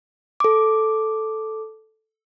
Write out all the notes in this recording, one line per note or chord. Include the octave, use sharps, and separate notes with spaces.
A4 D6